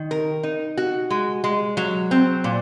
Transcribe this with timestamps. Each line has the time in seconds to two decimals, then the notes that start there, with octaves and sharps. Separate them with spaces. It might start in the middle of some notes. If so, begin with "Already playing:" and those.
Already playing: D#3
0.11 A#4
0.43 D#4
0.78 F#4
1.10 G#3
1.44 G#3
1.77 F#3
2.11 C4
2.44 A#2